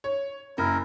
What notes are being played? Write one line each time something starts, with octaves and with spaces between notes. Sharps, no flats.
C#5
F#1 E4 A#4